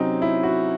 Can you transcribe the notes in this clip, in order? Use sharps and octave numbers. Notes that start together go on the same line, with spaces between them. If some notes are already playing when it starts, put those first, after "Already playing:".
Already playing: C3 F#3 C4 C#4 D#4
E4
F#4